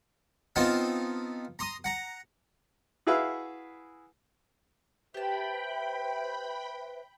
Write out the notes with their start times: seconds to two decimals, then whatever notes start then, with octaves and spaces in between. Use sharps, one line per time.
0.56 B3 C4 D#4 F4 F5 A5
1.59 A#5 C6 D#6
1.84 F#5 A#5
3.07 E4 F#4 G#4 B4 E5 F5
5.14 G4 B4 C5 E5 G5 A5 B5